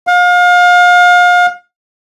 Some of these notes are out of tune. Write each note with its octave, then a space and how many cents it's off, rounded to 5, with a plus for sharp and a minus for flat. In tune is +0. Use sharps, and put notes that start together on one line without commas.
F5 +35